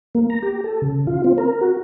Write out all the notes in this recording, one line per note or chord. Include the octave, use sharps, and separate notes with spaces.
A#3
A#5
G4
A4
C#3
F4
C4
A#4
F#4